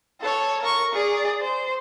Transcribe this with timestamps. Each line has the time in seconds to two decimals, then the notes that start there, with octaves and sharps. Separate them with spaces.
0.21 A4 C#5
0.62 A#4 C#6
0.93 G#4 D5
1.41 C5